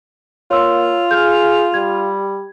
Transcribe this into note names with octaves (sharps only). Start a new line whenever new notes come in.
A#3 F4 C#5 C6 E6
G#4 F6 G6
G3 G#6